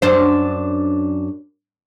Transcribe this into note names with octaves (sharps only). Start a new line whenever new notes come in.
F#2 D4 C5